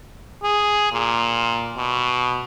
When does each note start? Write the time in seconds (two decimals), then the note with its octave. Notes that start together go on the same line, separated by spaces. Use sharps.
0.43 G#4
0.92 A#2
1.77 B2